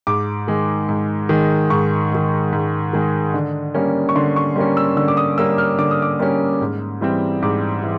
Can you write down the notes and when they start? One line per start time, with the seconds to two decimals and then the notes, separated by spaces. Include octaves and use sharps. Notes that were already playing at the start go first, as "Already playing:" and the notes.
0.07 G#2 D6
0.48 D#3 G#3
0.89 G#2
1.29 D#3 G#3
1.70 G#2 C#6
2.12 D#3 G#3
2.53 G#2
2.93 D#3 G#3
3.34 D3
3.75 G3 A#3 C#4
4.09 C#6
4.16 D3 C6
4.36 C#6
4.56 G3 A#3 C#4
4.77 E6
4.97 D3 E6
5.08 D6
5.17 D#6
5.38 G3 A#3 C#4 E6
5.58 F6
5.78 D3 D6
5.91 D#6
6.02 D6
6.20 G3 A#3 C#4
6.61 G#2
7.01 E3 G3 C4
7.42 G#2 D6
7.83 E3